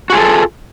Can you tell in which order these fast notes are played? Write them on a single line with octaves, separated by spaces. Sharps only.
F#4 G#4 F4 A4